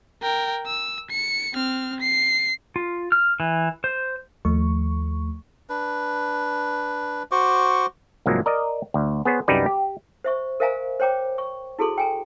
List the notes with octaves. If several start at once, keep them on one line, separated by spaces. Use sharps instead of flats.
A#4 G5
E6
C#7
C4 F6
C7
F4
F6
E3
C5
D#2 F3 A3 C#6
D4 B4
F#4 C5 C#6 D6
C2 G#2 F3 F#3 A#3
A#4 D5 D#5
D2
B3 G#4 C5 C#5
C2 F#2 G3 D#4 B4 D5
G4
C5 E5 C#6
A#4 C5 E5 F5 G#5 A#5
C5 C#5 G5 A#5 D6
C#6
E4 F#4 G#4 A4 C6
G5 G#5 A#5